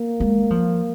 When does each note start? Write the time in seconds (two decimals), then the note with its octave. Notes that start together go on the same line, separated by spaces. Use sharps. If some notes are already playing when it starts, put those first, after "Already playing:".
Already playing: A#3
0.20 G#3
0.50 F3